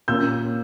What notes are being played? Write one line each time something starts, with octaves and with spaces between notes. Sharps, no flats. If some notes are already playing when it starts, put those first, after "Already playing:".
A#2 A#3 C#4 E6 G6